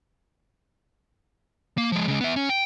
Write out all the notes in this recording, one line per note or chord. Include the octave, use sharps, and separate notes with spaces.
A#3
F3 G#3
C#3 G#3
B3 E5
C#4
G5